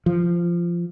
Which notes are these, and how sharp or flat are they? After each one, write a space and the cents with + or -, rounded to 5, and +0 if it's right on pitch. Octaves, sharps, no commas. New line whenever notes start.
F3 -15